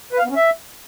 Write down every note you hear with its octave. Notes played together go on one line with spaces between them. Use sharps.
B4
F5
B3
C#4
E5